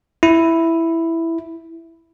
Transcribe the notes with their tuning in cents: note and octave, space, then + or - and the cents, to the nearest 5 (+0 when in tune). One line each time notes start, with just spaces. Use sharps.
E4 +0